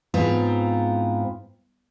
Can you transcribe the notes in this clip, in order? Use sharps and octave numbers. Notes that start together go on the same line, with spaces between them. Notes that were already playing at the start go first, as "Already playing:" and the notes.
G#2 B3 C4 E4 F4 A#5